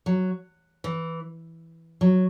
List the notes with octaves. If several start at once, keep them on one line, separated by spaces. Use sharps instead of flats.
F#3
E3
F#3